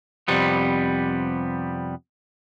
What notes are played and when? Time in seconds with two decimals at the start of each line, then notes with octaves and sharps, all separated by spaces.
0.28 F2 C3 G3 B3